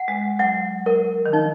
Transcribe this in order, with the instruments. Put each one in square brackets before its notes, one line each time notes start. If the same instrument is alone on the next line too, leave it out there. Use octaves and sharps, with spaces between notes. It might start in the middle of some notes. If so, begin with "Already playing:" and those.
Already playing: [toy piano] F#5
[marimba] G#3
[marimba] F#3 [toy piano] F#5
[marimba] F#3 [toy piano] A#4
[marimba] D#3
[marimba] F3 [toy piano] D#4